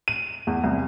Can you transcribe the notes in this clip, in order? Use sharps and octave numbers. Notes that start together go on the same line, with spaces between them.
D#7
E2
C2